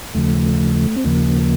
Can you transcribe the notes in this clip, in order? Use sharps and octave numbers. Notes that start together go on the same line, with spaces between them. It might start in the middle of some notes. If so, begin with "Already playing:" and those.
D#2 C#3 F3 A3
C4
D#2 C#3 F3 A#3